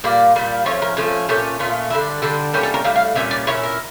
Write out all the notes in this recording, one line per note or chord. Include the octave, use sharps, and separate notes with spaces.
A#2 G3 A#3 D5
A#2 G3 A#3
F3 A3 C#4 C#5
A#4
F3 A3 C#4 A4
A#2 A3 C#4 G4
A#2 A3 C#4 F4
D3 G3 D4 E4
D3 G3 D4 A4
A2 G3 A#3 C#4 G4
A4
A#4
A2 G3 F5
F5
A#2 G3 C#4 E5
D5
A#2 G3 C#4 E4 C#5
A#4